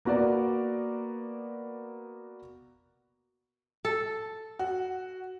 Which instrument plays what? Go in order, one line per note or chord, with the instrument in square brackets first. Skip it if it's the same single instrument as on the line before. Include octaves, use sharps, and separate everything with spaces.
[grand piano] A#3 B3 F#4 A#4 D5
[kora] A4
[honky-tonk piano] F#4